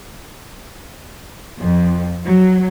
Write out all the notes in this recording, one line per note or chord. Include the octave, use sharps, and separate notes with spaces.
F2
F#3